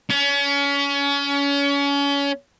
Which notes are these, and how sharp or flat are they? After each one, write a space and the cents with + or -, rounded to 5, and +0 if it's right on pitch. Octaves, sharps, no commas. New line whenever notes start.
C#4 +30